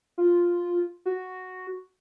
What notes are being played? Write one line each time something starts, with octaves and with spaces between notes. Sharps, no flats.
F4
F#4